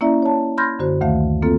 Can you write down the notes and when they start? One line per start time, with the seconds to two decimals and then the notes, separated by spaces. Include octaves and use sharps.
0.01 A#3 C#4 E4 D5 E5 A#5
0.22 C#5 A5
0.58 B5 C6 F6 G6 G#6 A#6
0.79 F#2 D3 F#4 C5
1.01 D2 D#3 A3 E5 F5
1.43 A#3 C4 F4 A4